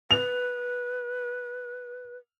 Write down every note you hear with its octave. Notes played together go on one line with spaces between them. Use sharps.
B4 F7